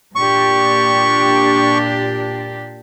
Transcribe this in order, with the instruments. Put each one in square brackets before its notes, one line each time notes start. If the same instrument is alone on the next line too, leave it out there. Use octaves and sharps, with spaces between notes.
[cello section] A#2 D4 G4 [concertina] C#6